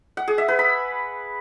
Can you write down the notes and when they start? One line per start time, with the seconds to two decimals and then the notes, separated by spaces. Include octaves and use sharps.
0.17 F#5
0.28 G#4
0.38 E5
0.48 B4
0.59 B5